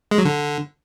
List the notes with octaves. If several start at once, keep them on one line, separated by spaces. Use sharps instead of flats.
G#3
F#3
D3